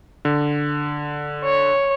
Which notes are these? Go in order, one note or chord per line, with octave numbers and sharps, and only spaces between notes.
D3
C#5